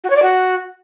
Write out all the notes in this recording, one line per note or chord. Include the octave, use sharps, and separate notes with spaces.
F#4
C#5
D5
F#4